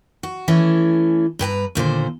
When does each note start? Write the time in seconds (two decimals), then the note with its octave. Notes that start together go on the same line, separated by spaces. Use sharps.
0.23 F#4
0.48 E3 A3 C#4
1.39 G2 B4 G#5 A#5
1.75 D#2 A#2 D3 C5